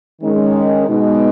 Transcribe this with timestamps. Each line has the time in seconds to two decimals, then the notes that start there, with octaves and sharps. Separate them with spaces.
0.22 D#3 G#3 C#4
0.88 B2 G#3 D#4